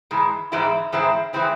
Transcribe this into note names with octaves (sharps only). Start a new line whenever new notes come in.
G#2 E3 G#3
G#2 E3 G#3 C4 E4
G#2 E3 G#3 C4 E4
E3 G#3 C4 E4